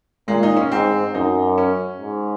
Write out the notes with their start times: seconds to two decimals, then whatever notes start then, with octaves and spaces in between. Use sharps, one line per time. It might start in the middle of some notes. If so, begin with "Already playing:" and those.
0.28 A#2 G#3
0.43 D#4
0.57 C#4
0.71 G#2 C4
1.14 F#2 D#4
1.58 C#4
2.00 G#2